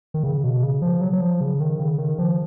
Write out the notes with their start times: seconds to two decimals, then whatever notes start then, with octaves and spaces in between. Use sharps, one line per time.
0.14 D#3
0.23 C#3
0.44 B2
0.63 C#3
0.82 F3
1.01 F#3
1.13 F#3
1.21 F3
1.41 C#3
1.60 D#3
1.79 C#3
1.98 D#3
2.18 F3